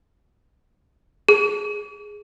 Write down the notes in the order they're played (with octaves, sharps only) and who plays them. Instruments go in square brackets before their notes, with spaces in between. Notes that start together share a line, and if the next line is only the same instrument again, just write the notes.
[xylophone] G#4